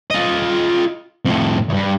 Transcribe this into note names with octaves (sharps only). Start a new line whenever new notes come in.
F4 D#5
F2 A2
E2 G2